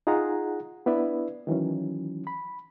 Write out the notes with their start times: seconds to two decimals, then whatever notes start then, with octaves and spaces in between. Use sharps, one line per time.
0.07 D#4 F4 G#4 F#5 A#5
0.86 B3 D4 E4 B4 D5 E5
1.47 D#3 E3 F#3 C#4
2.27 B5